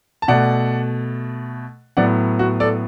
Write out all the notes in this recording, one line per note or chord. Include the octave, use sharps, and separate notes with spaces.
A5
B2 A3 D5 F#5
A2 F#3 B3 D5 F#5
F#4
A4 D5